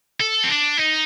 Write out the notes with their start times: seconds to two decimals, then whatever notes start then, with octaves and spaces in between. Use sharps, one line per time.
0.20 A4
0.44 C4
0.49 D4
0.78 D#4